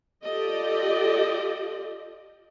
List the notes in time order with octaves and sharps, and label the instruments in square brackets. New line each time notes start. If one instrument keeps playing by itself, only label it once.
[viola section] F4 G4 A4 D5 D#5